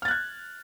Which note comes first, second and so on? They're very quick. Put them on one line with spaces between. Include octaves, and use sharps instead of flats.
F6 A6 F#6 G#6